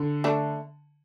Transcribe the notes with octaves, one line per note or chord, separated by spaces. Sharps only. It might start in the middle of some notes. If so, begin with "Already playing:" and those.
Already playing: D3
A3 D4